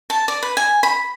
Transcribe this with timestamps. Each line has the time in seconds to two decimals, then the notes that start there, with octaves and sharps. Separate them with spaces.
0.10 A5
0.28 D5
0.43 B4
0.57 G#5
0.83 B5